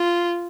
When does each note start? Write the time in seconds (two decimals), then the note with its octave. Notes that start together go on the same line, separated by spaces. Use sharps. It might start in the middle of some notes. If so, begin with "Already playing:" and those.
Already playing: F4